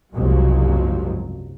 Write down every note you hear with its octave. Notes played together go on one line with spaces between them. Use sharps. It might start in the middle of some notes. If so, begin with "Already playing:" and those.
F#1 C2 G#2 F3 F#3